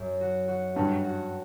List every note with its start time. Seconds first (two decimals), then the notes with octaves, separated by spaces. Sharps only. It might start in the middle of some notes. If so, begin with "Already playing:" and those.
Already playing: F#2
0.21 F#4
0.48 F#4
0.76 G2 F#4
1.04 F#4